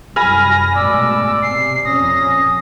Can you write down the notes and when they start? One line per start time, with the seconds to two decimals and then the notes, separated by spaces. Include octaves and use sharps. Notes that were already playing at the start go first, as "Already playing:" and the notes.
0.16 C2 F#2 G#5 B5 F6 A#6
0.76 G#1 B2 A3 D5 E6
1.42 C3 C7
1.85 F2 A#2 C#4 D#6 A#6